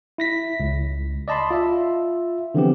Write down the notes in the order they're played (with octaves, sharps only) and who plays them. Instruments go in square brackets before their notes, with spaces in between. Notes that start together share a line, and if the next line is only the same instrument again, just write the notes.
[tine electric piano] E4 A#6 B6
C#2
D5 D#5 A5 B5 C6
F4 E5
D3 E3 F3 B3 C4 G4